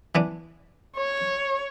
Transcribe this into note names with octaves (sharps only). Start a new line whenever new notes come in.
E3 B3 D4
C#5